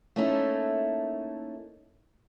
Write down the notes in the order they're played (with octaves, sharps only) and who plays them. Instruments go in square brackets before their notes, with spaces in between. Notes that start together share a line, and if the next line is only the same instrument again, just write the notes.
[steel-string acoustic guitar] A3 A#3 C#4 D#4 E4 A4